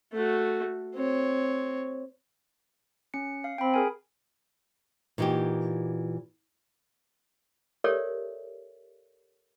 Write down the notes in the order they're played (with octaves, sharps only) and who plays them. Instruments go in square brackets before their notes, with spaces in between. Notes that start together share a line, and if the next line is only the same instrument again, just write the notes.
[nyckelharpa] A3 F#4
C4 C#5
[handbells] C#4 C#7
F5
[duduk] C4 [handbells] G5 B5
[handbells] G#4 A#4 G#5
[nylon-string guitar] A#2 E3 D#4 F#4 G4
[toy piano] G4 A4 A#4 C#5 D5 E5